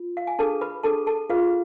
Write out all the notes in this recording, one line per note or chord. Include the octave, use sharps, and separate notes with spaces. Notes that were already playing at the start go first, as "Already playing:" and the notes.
Already playing: F4
F5
G#5
D4 G#4 A4 B4 A5
B4 B5
D4 G#4 A4 B4 A5
A4 A5
F4 G#4 B4 F5